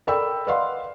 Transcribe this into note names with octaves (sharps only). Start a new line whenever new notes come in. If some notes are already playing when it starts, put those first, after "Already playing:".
A4 A#4 D5 G5 B5 E6
B4 D5 D#5 F5 F#5 C6